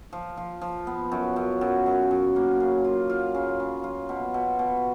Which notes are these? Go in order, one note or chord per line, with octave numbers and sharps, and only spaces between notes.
F3
F3
F3
B3
F#2
F#2
F#2
F#2
F#2
A#3
C#3
F4
F4
C#3
C#3
F4
B2
B2
B2